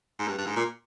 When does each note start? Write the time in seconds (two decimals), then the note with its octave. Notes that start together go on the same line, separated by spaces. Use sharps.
0.19 G#2
0.28 G2
0.38 G2
0.47 G#2
0.56 A#2